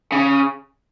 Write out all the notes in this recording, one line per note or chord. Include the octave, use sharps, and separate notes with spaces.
C#3